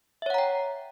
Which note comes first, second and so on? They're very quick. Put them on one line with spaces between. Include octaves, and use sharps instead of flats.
E5 C#5 F#5 A#5 G5